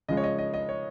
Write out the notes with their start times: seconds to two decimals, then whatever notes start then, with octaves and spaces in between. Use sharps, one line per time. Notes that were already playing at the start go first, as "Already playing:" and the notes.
0.09 C#3 F3 G#3 D#5
0.17 C#5
0.23 D#5
0.38 D#5
0.54 D#5
0.69 C#5